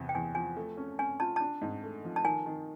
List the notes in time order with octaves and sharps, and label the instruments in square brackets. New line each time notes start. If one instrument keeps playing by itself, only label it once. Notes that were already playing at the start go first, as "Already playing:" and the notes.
Already playing: [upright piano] E2 C3
[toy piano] G5
[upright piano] E2 [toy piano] G#5
[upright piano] F3 [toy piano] G#5
[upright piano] A3
C#4
[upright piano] C#4 [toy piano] G#5
[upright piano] F4 [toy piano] A5
[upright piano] D4 [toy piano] A5
[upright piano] G#2
A3
F3
[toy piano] A5
[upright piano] D#3 [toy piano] G#5
[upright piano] D#3